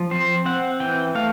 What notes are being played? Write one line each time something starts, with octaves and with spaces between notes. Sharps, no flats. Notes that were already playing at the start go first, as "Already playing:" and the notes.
Already playing: F3
C4 C5
C4 F#5
E3 G5
A3 F5